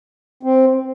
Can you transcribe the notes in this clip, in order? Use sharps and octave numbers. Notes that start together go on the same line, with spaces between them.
C4